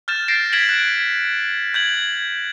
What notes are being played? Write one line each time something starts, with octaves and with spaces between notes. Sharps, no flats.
F6 G6 A6 E7
F6 G6 A6 A#6 C7 D7
G#6 B6 D7 E7 F#7
F#6
G6 G#6 F#7